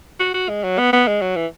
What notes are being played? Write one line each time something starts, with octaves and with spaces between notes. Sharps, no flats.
F#4
F#4
G#3
F#3
B3
B3
G#3
F#3
E3